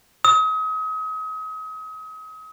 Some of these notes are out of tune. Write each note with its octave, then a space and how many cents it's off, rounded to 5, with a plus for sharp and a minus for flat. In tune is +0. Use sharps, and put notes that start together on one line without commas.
D#6 +35